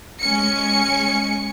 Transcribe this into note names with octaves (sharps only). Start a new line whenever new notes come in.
G#3 C#4 G#5 C#7